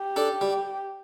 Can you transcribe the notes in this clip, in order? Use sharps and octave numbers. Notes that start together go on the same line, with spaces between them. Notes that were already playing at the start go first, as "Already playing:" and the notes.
Already playing: G4
D4 A4
G3